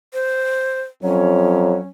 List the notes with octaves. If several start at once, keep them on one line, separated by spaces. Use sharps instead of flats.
C5
F2 F#3 C#4